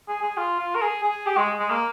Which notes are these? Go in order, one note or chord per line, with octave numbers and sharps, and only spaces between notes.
G#4
G#4
F4
F4
A#4
G#4
G#4
G4
G#3
G#3
A#3